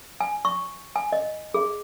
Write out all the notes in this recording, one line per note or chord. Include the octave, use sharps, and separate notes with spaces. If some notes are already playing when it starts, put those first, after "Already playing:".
G#5
C#6
G#5
D#5
G#4